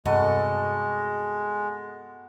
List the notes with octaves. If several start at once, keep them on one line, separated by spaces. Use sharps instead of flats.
G2 C3 G#3 B3 F#4 A4 D#5